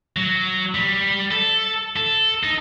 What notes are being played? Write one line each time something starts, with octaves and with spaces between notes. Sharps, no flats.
F#3
G3
A4
A4
D#4